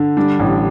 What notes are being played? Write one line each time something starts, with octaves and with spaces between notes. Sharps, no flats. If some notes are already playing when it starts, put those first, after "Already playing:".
Already playing: D3
G3 D4
A1